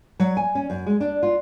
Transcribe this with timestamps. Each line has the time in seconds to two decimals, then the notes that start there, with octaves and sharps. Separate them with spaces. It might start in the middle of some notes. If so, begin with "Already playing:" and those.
0.20 F#3
0.37 G#5
0.55 C#4
0.70 F#2
0.87 G#3
1.01 D4
1.23 F4